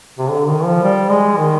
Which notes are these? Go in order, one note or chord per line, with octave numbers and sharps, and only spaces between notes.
C3
D3
D#3
F3
G3
G#3
D#3